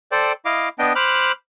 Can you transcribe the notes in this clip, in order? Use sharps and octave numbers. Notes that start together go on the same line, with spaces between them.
A4 C5 D5 G5
E4 D#5 F5 D6
B3 D4 D#5 G5
C5 B5 D6 F6 F#6